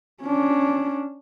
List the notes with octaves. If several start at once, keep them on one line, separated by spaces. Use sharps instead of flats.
C#4 D4